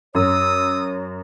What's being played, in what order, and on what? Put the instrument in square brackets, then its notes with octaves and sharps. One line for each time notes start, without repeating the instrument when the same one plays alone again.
[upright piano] F#2 [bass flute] C#5 [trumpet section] D#6 [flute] E6